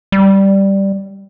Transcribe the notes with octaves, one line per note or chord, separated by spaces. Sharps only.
G3